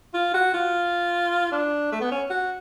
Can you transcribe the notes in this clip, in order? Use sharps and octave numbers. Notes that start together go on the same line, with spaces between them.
F4
F#4
F4
D4
A3
B3
C#4
F#4